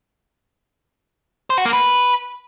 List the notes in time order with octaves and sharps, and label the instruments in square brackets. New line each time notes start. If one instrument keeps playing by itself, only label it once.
[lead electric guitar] C5
F#4
A#3
B4